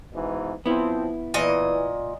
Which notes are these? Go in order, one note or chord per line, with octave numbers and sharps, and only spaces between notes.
G#2 B2 E3
F3 B3 C4 E4
A#2 E3 D#5